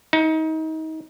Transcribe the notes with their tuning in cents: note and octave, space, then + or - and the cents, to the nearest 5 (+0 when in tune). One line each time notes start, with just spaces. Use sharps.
D#4 +30